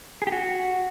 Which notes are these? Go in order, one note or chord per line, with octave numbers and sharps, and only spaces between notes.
G#4
G4
F#4